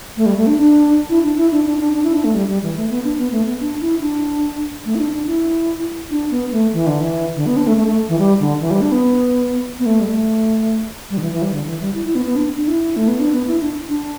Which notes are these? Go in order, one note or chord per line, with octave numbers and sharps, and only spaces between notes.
A3
G3
A3
D4
D4
E4
D4
E4
D4
D4
D4
D4
E4
D4
A3
G3
G3
E3
A3
B3
D4
B3
A3
B3
D4
E4
D4
A3
E4
D4
D4
E4
D4
B3
A3
E3
D3
E3
D3
B3
D4
A3
A3
A3
E3
G3
D3
E3
G3
D4
B3
B3
A3
G3
A3
G3
D3
E3
E3
G3
D3
E3
G3
E4
E4
B3
B3
D4
D4
E4
A3
B3
D4
B3
E4
D4
D4